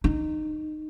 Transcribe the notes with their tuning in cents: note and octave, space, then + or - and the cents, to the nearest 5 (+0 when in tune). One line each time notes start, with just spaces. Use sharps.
D#4 -20